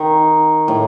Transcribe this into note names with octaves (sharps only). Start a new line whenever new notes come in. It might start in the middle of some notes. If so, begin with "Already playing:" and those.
Already playing: D#3
A2